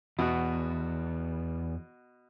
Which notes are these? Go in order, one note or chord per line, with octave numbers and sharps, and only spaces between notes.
E2 B2 F#4